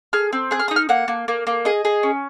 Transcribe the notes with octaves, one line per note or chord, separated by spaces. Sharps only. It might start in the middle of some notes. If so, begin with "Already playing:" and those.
G#4 F6
C4
G#4 F#6
F6
D#6
D#4
F6
A#3 F#5
A#3
A#3
A#3
G#4 D#5
G#4
C#4